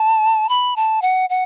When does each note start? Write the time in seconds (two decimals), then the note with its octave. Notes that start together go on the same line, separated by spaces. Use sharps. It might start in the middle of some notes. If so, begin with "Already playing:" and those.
Already playing: A5
0.49 B5
0.76 A5
1.02 F#5
1.30 F#5